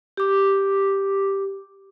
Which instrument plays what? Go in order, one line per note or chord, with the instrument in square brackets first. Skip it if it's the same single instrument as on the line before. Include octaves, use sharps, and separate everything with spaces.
[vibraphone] G4 D6